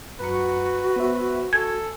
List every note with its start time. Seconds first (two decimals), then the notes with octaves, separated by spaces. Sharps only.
0.20 F#2 F#4 B4 A#5 C#7
0.96 B3 C5 E5
1.53 A4 G#5 G#6